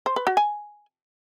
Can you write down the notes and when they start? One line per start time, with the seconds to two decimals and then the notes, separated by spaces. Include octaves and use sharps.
0.06 C5
0.16 B4
0.27 F#4
0.37 G#5